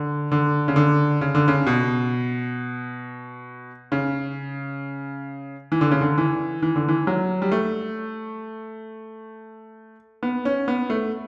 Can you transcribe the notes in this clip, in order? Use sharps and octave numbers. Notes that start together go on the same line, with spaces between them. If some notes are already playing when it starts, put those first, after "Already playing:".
Already playing: D3
D3
C#3
D3
C#3
D3
C#3
B2
C#3
E3
D3
C#3
D3
E3
E3
D3
E3
F#3
G3
A3
B3
C#4
B3
A3